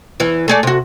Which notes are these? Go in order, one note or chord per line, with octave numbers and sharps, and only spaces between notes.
E2 E3
A3 G#4 D5
C3 F#4